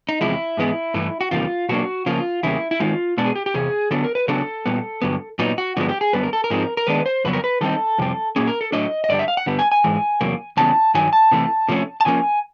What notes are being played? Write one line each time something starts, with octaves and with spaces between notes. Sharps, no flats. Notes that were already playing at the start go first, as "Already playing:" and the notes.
D#4
E2 C3 F3 G#3 E4
G#2 E3 G#3 B3
G2 E3 A3
F#4
E2 C3 D#3 G3 A#3 F4
B2 F#3 A#3 D4 F#4
C#3 F3 A#3 F4
E2 C#3 G3 A#3 E4
E4
D#3 G#3 C4 D#4 F4
B2 G#3 B3 D4
G#4
G4
G4
E2 C3 G#4
D3 F#3 B3 D4 A4
A#4
B4
C#3 F#3 B3 D4 A4
A#2 G3 B3
G2 D3 F#3 B3
A#2 F#3 B3 D#4
F#4
G2 D3 F3 G#3 B3 F#4
G4
G#4
F#2 D3 G3 B3 B4
A#4
A4
A#4
G#2 F3 G#3 C4 D#4
A#4
D#3 G#3 B3 D4 B4
C5
F2 C#3 F#3 B3 B4
A#4
B4
D#3 G3 C4 D#4 A4
F2 C3 G3 C4
A#2 F#3 A#3 C#4 G#4
A#4
A4
A2 F#3 A3 D4 D#5
D#5
G2 D3 G3 D5
E5
F5
F#5
G2 D3 G3 B3
G#5
G#5
G#2 E3 G#3
E2 C3 F#3 A#3
F2 C#3 E3 G3 B3 A5
G2 D#3 F#3 G#5
A5
C3 E3 A3
C3 F3 A3 C#4
A5
C#3 F3 A#3 C#4 G#5